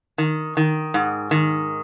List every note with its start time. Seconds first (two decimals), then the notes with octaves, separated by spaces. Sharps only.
0.18 D#3
0.57 D#3
0.94 G#2
1.31 D#3